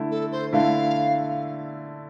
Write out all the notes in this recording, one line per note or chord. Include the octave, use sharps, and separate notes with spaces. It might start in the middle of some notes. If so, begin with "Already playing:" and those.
Already playing: D3 A3 E4
A4
C5
D3 A3 E4 F5